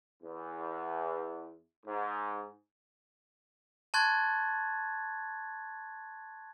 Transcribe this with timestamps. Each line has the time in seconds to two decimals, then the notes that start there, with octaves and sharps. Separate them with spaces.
0.23 E2
1.86 G#2
3.94 A5 C6 C#6 F#6 G#6 A6